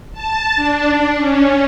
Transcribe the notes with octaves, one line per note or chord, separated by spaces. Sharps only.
A5
D4
C#4